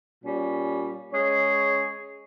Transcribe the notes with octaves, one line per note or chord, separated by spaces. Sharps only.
A#2 G3 C#4
G#3 C#4 G#4 C#5